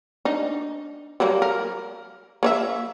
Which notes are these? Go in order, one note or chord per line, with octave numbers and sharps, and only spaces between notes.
D4 D#4
F#3 G3 A#3
A#4
A#3 C#5 E5